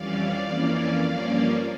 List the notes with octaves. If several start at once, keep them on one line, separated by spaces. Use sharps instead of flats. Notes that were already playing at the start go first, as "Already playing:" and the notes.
Already playing: F2 E3 G3 C#4 D5 F5
F2 E3 A#3 C#4
G2 F3 A#3 C#4